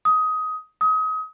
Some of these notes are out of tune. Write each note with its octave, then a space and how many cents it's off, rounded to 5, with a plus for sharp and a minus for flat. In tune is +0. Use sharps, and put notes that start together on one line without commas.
D#6 +15
D#6 +30